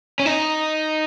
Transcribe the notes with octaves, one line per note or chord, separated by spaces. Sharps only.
C#4
D#4